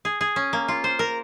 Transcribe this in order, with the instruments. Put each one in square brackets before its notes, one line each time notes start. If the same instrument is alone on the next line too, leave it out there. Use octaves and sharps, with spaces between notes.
[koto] G#4
G#4
C#4
A#3
F4
C5
A#4